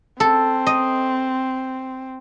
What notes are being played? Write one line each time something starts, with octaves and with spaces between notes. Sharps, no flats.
C4 A4
D#5